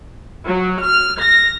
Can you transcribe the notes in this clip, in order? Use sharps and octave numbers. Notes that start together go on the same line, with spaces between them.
F#3
F6
A#6